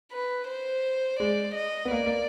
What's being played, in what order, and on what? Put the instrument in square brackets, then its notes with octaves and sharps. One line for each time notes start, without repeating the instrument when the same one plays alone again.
[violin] B4
C5
[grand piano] G#3 [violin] D5
[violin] D#5
[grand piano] B3
[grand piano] A#3 [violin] D5
[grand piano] A#3